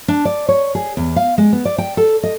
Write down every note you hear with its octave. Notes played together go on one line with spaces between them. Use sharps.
D4
D5
C#5
G#4
E2
F5
G#3
B3
D5
G5
A4
D#5